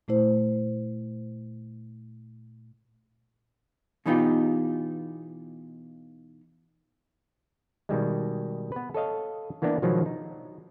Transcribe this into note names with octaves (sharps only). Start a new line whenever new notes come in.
A#2 A3 E4 C5
B2 E3 B3 D#4 F4 G4
B2 D#3 G3 G#3
B3 B4
A4 C#5 D#5 F5
E3 A#3 B3 D4
B2 D#3 F3 F#3 G#3 B3
D#4